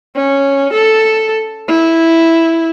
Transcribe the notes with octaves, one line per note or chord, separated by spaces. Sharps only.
C#4
A4
E4